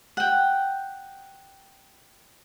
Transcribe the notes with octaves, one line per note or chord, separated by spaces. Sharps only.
F#5 G5